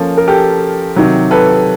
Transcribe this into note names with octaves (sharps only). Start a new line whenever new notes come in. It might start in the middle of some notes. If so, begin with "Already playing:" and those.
Already playing: F3 A#3 C#4 A4
A#4
G4 A4
C3 D#3 F#3
A4 B4